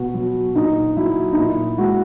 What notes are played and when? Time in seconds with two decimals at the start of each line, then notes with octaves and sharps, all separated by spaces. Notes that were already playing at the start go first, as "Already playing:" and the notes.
Already playing: B2 F#4
0.14 F#3
0.55 A#2 D#4
0.97 F#3 E4
1.32 D#4
1.37 A#2 E4
1.78 G#3 F#4